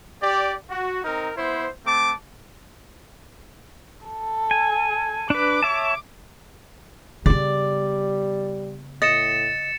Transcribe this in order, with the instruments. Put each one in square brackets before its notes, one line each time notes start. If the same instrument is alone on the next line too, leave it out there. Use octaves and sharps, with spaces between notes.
[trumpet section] G4 D5
F#4
C4 D#4 A#4
B3 E4 C5
A3 C4 A5 D6
[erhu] A4
[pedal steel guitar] G#5
[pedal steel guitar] D4 B4 [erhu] D6
[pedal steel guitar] C#5 E5 A5
[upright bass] C#3 B3 [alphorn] G3 [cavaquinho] D5
[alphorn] A2 [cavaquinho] D#5 [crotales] A6 C#7 E7